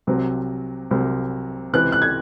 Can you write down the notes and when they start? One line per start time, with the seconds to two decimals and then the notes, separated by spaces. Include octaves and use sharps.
0.07 C2 C3 F#3 C4
0.91 C2 C3 F#3 C4
1.73 C#2 C3 E3 C4 F#6
1.92 F#6
2.02 G#6